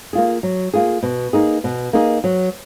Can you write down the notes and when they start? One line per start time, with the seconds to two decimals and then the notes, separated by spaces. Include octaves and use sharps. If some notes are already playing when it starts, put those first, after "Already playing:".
0.13 A#3 F4 G#4
0.43 F#3
0.74 A#3 F4 G#4
1.03 B2
1.33 A#3 D#4 G#4
1.64 B2
1.93 A#3 D#4 G#4
2.24 F#3